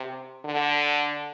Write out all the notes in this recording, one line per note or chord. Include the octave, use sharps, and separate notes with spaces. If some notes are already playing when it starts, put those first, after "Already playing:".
Already playing: C3
D3